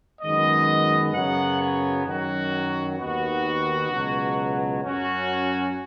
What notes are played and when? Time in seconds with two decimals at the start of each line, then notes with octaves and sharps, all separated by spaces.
0.21 F#2 D#3 G#3 B3 D#5
1.14 F#2 C#3 F#3 B3 F#5
1.60 C#5
2.06 F#2 D#3 F#3 F#4
2.99 D#2 D#3 B3 F#4
3.91 C#2 B2 F#3
4.84 F#2 F#3 C#4 F#4